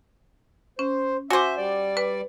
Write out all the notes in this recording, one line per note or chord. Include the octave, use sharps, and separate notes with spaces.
C#4 C5
F#4 C5 E5 G#5 D6
G3 D5
B4